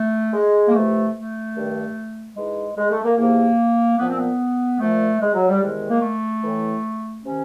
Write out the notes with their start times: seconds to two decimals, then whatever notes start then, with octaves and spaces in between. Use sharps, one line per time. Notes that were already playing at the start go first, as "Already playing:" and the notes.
Already playing: A3
0.33 G#3
0.68 A#3
0.74 F2 C3 E3 A3
1.14 A3
1.55 G2 D#3
2.37 G#2 E3 G#3
2.77 G#3
2.91 A3
3.04 A#3
3.18 E2 C3 F3 A#3
3.98 A#2 F3 B3
4.09 C4
4.19 B3
4.80 A#2 F3 A3
5.21 G#3
5.34 F#3
5.49 G3
5.61 E2 C3 D#3 G#3
5.90 A#3
6.02 A3
6.43 A2 E3
7.24 C3 D#3 C#4